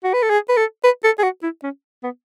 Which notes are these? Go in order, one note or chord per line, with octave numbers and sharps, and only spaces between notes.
F#4
B4
A4
G#4
B4
A4
B4
A4
G#4
F#4
E4
C#4
B3